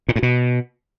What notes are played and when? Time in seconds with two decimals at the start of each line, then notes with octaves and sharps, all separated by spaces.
0.09 A#2
0.16 A2
0.23 B2